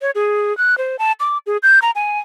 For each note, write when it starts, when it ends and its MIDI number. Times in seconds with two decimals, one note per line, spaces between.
0.02 0.11 73
0.15 0.56 68
0.58 0.77 90
0.78 0.96 72
0.99 1.12 81
1.20 1.38 86
1.47 1.57 68
1.63 1.79 91
1.82 1.91 82
1.95 2.19 80